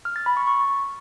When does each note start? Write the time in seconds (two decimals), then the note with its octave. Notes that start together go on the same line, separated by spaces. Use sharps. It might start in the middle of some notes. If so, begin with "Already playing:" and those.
0.05 F6
0.16 A6
0.26 B5
0.37 C#6
0.47 C#6